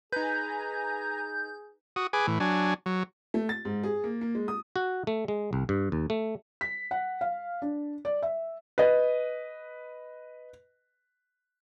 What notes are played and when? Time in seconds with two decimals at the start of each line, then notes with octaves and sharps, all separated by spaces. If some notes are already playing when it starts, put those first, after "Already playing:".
0.12 D#4 G#4 B4 G#5 A#5 G6
1.96 F#4 D#6
2.13 G#4 B4 G#5 D6
2.27 A2 E3
2.40 F#3 D4 G#5
2.86 F#3
3.34 A3
3.49 A6
3.65 G#2
3.83 G#4
4.04 A#3
4.21 A#3
4.35 G#3
4.48 D#6
4.76 F#4
5.07 A3
5.28 G#3
5.53 C2
5.69 G2
5.92 D#2
6.10 A3
6.61 B6
6.91 F#5
7.21 F5
7.62 D4
8.05 D5
8.22 E5
8.78 B4 D#5